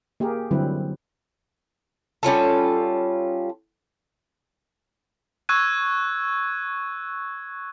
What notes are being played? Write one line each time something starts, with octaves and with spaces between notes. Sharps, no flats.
A#3 G4 G#4 A#4
D3 F#3 G3 C4 E4 B4
G3 C#4 F4 A4
C#6 E6 F#6 G#6 D#7